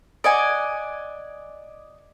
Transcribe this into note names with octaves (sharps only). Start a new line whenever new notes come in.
D5 D#5 F#5 G#5